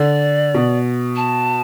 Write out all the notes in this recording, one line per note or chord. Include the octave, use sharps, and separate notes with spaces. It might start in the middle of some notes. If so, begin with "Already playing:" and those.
Already playing: D3 D5
B2
A5